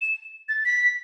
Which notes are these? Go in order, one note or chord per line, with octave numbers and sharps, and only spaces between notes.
E7
A6
B6